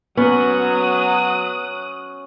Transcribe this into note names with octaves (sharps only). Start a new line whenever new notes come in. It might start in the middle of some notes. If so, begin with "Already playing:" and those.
F#3 B3 C#4 F#4 D#6 F#6